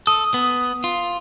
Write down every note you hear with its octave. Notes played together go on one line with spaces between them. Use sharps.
A4 D#6
B3
F4